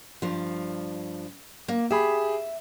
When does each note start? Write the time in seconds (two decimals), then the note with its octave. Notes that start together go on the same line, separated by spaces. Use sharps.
0.22 G2 F3
1.68 A#3
1.91 G4 G#4 E5 B5